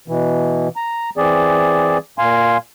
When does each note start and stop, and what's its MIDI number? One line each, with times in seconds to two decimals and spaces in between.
0.08 0.68 47
0.08 0.68 52
0.76 1.10 82
1.17 1.98 52
1.17 1.98 60
1.17 1.98 68
1.17 1.98 74
2.18 2.57 46
2.18 2.57 77
2.18 2.57 80
2.18 2.57 84